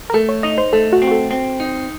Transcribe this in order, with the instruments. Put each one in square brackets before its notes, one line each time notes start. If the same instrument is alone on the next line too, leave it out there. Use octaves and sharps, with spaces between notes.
[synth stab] A#4
[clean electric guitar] A3 [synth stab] A4
[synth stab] C#5
[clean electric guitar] D#4 [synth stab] D#5
[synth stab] C5
[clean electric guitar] A3 [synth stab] A4
[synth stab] F#4
[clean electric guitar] C4
[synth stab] F#4
A4
[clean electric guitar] C4
D#4